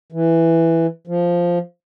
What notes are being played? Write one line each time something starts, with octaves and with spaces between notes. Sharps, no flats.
E3
F3